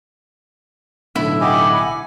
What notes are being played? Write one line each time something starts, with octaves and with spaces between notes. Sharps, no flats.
B1 A2 D3 E4 E5
G4 D#5 F#5 G#5 B5 D6
G#5